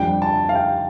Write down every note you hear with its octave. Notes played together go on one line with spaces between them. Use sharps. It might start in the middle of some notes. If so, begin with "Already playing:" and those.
Already playing: F2 D3 G3 G5
A5
F5
G5